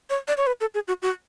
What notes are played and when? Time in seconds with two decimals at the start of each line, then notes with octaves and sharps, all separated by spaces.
0.10 C#5
0.28 D5
0.37 C#5
0.47 B4
0.61 A4
0.74 G#4
0.88 F#4
1.02 F#4